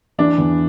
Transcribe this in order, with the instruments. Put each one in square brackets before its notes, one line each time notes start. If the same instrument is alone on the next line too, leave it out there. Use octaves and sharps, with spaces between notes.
[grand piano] E3 [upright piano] D4
[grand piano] E2